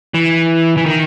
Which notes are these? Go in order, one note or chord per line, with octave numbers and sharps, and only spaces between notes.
E3
E3
D#3